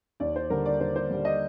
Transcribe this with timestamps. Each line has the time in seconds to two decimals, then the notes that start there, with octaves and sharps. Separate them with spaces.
0.20 D#2 D5
0.36 C5
0.50 D3 G3 A#4
0.66 D5
0.80 D#2 C5
0.96 C5
1.10 D3 G3
1.25 D#5